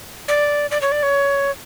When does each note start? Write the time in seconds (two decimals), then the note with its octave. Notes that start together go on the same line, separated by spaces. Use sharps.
0.28 D5
0.71 D5
0.81 C#5
0.92 D5
1.03 C#5